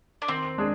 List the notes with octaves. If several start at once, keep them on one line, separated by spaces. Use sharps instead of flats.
D4
D#3 C4
G#3 D4 G#4